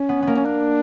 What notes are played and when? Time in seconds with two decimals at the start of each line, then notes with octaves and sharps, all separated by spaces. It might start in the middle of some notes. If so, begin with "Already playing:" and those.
Already playing: C#4
0.09 B3
0.22 A#3 B3
0.36 C#4
0.45 D4